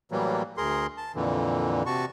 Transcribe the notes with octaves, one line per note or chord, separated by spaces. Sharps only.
A2 E3 F#3 G3 A#3
D2 G#4 A#4 C6
A5
F2 A#2 D3 E3
C3 F#4 A5 C#6